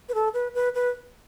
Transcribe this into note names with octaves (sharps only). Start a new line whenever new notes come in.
B4
A4
B4
B4
B4